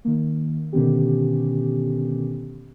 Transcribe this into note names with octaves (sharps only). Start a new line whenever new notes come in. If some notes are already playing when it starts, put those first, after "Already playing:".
D#3 A#3
B2 D3 D#3 B3 C#4 G4